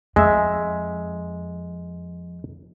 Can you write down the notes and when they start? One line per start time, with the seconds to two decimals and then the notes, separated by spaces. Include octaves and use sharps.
0.16 F2 G#3 E5